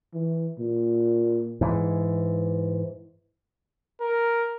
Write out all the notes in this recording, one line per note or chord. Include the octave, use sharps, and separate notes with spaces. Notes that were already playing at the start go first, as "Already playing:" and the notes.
E3
A#2
G#2 E3
A#4